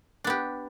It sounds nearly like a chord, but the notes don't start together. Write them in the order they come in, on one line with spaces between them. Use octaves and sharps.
D4 B3 G4